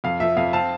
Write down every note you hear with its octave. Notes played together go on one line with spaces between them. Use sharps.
F2 F5
F3 E5
F2 F5
C4 F5 A5